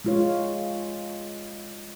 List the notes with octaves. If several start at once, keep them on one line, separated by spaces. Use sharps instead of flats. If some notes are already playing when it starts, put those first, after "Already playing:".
G#3 F4 C#5